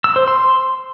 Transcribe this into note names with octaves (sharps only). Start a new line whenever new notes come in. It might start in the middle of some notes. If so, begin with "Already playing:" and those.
E6
C5
C6